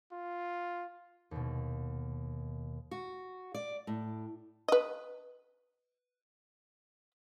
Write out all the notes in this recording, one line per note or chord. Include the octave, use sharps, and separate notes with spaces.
F4
D#2 B2
F#4
D5
A2
B4 D#5